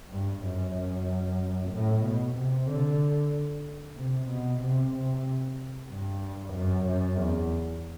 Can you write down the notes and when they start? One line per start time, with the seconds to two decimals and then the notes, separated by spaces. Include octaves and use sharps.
0.10 G2
0.43 F#2
0.74 F#2
1.71 A2
2.03 B2
2.35 C3
2.67 D3
3.96 C3
4.28 B2
4.60 C3
4.92 C3
5.88 G2
6.52 F#2
6.85 F#2
7.17 E2